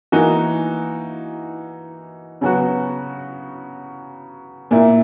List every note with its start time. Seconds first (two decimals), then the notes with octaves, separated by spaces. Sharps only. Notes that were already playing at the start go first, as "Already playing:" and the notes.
0.12 E3 A#3 D#4 F#4
2.41 C#3 F#3 B3 F#4
4.71 A#2 A#3 E4